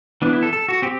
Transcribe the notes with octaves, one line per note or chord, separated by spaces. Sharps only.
E3 B3 D4
E4
A4
A4
F#4
C4 G4